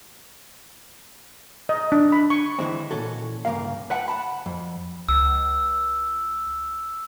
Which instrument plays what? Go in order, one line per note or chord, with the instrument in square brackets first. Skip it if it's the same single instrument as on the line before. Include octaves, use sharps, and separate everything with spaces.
[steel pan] D#5
D4
B5
C#6
[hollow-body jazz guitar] D3 E3 G#3 C4
A#2 E3 C#4 F#4 A4
C#2 G2 B2 A#3 A#4 F5
B4 E5 F#5 G5 A5
F#5 A5 B5
F2
[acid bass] C#2 [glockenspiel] E6